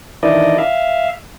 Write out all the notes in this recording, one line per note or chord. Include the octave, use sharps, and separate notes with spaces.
D#3 E3 D4 E4 D5 D#5
E5 F5